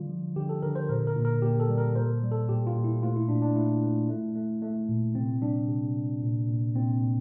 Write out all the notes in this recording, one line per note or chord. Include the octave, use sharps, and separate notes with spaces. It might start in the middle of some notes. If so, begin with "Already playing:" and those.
Already playing: D3 G3 F4
F3
D3 G4
A4
D3 A#4
C5
A#2 A#4
A#4
A#2
A#4
A#2 G4
A4
G3
A#4
A#2 C5
G3
A4
A#2 G4
F4
A#2
E4
A3 F4
E4
A#2 D4
D4
A3 E4
A3
A3
A3
A3
A#2
C3 C4
G3 D4
C3
C3
A#2
A#2
A#2 C4
A#2